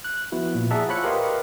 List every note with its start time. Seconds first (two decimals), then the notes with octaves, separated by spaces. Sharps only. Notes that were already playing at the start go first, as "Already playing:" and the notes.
0.04 F#6
0.32 F3 B3 E4 F#4
0.55 A#2
0.71 G#4 D5 E5 F#5 A5 A#5
0.88 F4 C5 C#5 B5 F#6 C#7
1.04 G4 A#4 B4 D#5 F5 C6